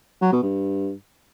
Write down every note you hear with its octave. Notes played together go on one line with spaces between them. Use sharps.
F#3
B2
G2